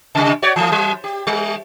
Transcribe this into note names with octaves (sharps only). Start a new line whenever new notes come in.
C3 G3
F#4 C#5 D5
E3 A3
F#3
G4
G3